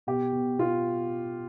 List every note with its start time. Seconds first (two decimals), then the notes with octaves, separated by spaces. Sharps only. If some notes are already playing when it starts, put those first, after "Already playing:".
0.07 B2 G4
0.33 B2
0.58 B2 F4